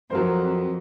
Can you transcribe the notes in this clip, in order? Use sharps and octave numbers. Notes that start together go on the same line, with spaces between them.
F2 F#3 A#4 C5